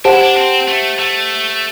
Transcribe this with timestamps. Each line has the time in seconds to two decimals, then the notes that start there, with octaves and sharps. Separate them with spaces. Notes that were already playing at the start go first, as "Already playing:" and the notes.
0.05 D4 G4 C5 F#5 A5
0.13 E4
0.20 D4
0.36 C4
0.68 A3
0.99 A3